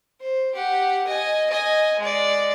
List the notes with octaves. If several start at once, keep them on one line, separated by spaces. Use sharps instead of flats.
C5
G4 F#5
D#5 G#5
D#5 G#5
G#3 D5